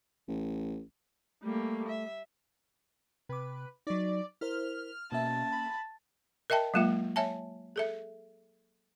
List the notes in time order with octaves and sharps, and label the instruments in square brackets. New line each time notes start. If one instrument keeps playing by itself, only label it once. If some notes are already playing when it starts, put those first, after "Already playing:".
[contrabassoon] A1
[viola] G3 A#3 [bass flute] A3
[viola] E5
[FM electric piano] C3 D6 [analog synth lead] B4
[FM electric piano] F#3 D#4 [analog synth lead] D5
[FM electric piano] E4 A#4 C5 [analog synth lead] F6
[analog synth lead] B2 [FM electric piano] A#3 C#4 E5 [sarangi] A5
[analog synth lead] B5
[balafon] A#4 D#5 E5 G5 A5
F#3 G#3 A#3 F4 E5
C#5 E5 G#5 A5
G#4 A4 E5